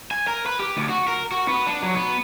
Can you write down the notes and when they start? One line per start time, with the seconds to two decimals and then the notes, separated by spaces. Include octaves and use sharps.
0.11 G#5
0.27 A#4
0.46 B4
0.60 G4
0.77 D2
0.89 F#4
1.08 A#4
1.31 F#4
1.48 B3
1.67 D4
1.83 F#3
1.95 B3